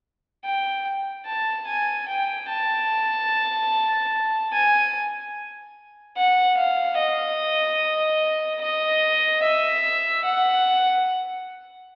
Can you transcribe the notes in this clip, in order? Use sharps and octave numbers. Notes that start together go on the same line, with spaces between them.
G5
A5
G#5
G5
A5
G#5
F#5
F5
D#5
D#5
E5
F#5